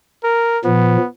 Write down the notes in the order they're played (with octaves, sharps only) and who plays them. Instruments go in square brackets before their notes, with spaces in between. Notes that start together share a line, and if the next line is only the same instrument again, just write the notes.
[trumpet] A#4
[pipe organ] A#2 F3 [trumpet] B3